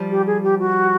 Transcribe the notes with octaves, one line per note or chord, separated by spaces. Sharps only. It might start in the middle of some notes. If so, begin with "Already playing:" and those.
Already playing: F3 G3
G4
G#4
G4
F#4